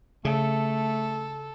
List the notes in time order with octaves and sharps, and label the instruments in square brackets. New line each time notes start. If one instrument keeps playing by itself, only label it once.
[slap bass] C#3 [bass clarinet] A3 [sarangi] A4